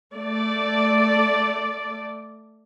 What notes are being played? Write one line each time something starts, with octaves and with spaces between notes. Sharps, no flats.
A3 D5